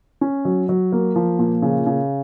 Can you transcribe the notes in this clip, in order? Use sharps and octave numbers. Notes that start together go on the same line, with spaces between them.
C#4
F#3
F#3
A#3
F3
A#2
C#3
C#3